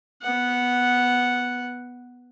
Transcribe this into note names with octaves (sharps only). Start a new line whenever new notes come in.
B3 F#5